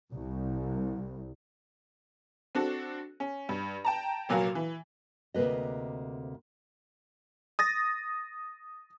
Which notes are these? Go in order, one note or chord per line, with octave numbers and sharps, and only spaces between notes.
C2
C4 D4 F#4 A4
C#4
G2
G5 A5 A#5
F1 A#2 F#3 A#3 F#4 F5
E3
D2 C3 A#3 B4 D#5
D#6 A6 A#6